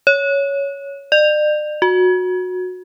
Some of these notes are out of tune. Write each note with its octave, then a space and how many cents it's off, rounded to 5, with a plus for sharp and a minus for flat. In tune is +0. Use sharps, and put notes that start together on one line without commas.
C#5 +10
D5 +45
F#4 -20